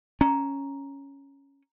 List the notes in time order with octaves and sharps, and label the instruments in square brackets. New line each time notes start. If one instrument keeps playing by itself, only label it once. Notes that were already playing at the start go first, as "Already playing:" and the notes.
[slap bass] C#4 [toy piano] A#5